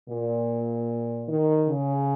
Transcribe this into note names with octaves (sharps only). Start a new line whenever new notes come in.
A#2
D#3
C#3